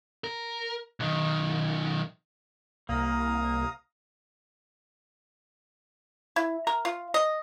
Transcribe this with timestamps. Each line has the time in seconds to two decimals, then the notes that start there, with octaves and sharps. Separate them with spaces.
0.24 A#4
1.00 B1 D#3
2.89 C2 A#3 F5 A#5 D#6
6.36 E4
6.67 A#4
6.85 F4
7.14 D#5